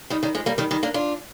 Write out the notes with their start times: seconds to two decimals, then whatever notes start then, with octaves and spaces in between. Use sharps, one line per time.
0.10 D#3 G3
0.23 D#3 G3
0.35 F3 G#3
0.46 G3 A#3
0.58 D#3 G3
0.71 D#3 G3
0.83 A#3 D4
0.94 D4 F4